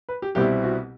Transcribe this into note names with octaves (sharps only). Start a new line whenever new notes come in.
B4
G4
C2 B2 G3 C4 E4 G4
F#4